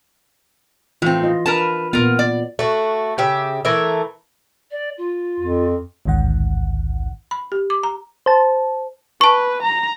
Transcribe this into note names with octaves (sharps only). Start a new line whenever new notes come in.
A2 E3 C4 F4
F4 D#5
D4 A#4 B4 A5
A#2 B3 F4 A#4
D5
A3 F#4
C#3 G4 E5
E3 A3 A#4 E5
D5
F4
F2
A1 D2 G#2 D#3 F#5
B5
G4
D6
A#5
C5 A5
B4 A5 C#6
A#5